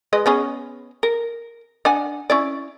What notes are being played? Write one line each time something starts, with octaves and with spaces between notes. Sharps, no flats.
G#3 B4 D#5
B3 C#4 G#4
A#4
D4 F#5 G#5
C#4 E4 D5